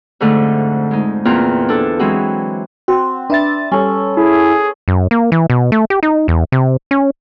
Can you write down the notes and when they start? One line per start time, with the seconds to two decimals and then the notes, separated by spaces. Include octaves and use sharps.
0.20 F2 G#2 D3 A3
0.91 G#3 D#4
1.25 E2 A#2 C4 F4 A#5
1.69 D4 A4
1.99 E3 F#3 G#3 C4 F#4 G#4
2.88 C4 F#4
3.30 D4 B4 E5 A6
3.72 G3 C#4 A4
4.17 E4 G#4
4.88 F#2
5.11 A#3
5.32 E3
5.50 B2
5.72 A3
5.90 G4
6.03 D#4
6.28 E2
6.52 C3
6.91 C#4